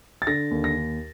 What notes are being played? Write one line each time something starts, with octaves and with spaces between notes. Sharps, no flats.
A6
D3 A#6
D#2
A#6